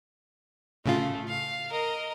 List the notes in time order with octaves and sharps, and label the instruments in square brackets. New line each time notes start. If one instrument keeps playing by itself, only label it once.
[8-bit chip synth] A2 C#3 F4 [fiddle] A3
[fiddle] F5
A#4 D#5